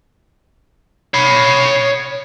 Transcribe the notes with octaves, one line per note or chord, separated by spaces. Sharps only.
C#5 B5